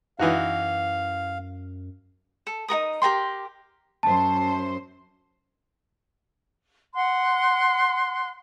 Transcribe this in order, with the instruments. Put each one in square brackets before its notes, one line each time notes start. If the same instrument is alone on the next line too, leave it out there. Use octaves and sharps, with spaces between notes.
[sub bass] F#2 [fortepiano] E3 D#4 F#4 [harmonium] F5
[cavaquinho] A4
D#4 F#4 A#4 D#6
G4 A#4 G5 C6
[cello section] F#2 C5 [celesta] A5
[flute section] F#5 C6 F#6